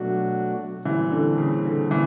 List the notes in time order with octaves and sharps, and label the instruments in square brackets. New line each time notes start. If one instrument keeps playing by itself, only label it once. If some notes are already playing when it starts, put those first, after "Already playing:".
Already playing: [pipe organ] B2 F#3 A3 D4 F#4
[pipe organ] A#2 G3 C4 [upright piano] E3
[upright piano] D3
C#3
D3
E3